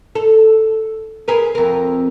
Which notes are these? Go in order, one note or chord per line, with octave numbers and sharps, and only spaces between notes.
A4
G#4 A#4 B4
F2 A#4